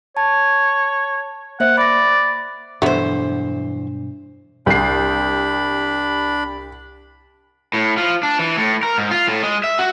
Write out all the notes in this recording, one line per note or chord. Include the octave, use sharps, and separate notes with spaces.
C#5 A5
A#3 C5 E5 F#5
D5 B5 A#6
E2 G2 B2 F#3 A3 B3 D4 C5
C2 D4 B5 C7
A2
F3
D4
E3
A2
A#4
G#2
F4
A2
G#3
E5
F#4